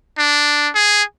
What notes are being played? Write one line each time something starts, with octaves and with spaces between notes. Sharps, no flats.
D4
G#4